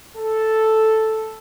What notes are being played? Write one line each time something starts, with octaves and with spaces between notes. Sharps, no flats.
A4